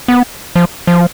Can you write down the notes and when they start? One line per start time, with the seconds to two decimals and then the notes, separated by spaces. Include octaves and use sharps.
0.08 B3
0.56 F3
0.87 F3